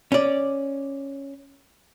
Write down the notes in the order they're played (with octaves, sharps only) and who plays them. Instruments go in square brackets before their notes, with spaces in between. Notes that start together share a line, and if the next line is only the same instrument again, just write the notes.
[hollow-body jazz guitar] C#4 D5